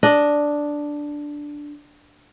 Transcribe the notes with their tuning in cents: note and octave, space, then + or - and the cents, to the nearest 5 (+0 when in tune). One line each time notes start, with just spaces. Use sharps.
D4 +0 D#5 +0